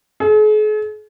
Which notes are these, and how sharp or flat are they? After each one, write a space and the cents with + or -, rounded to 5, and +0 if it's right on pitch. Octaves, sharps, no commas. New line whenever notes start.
G#4 +45